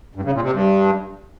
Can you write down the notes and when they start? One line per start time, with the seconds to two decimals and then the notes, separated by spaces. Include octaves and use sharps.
0.15 G2
0.24 C#3
0.33 A#2
0.42 C3
0.51 G2